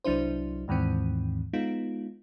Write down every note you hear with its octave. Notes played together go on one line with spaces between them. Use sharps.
C2 F#3 D4 E4 C5
D#2 G#2 D#3 E3 C4
G#3 B3 D#4 F4